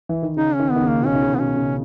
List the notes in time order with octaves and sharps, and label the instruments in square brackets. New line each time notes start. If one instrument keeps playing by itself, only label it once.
[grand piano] E3
D#3
[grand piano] C#3 [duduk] D#4
[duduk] C#4
[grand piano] D#3
[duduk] B3
[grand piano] D#3
C#3
[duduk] A#3
[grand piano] B2
[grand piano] C#3 [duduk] C#4
[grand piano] D#3
C#3
[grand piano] C#3 [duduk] B3
[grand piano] B2 [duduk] C#4
[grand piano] C#3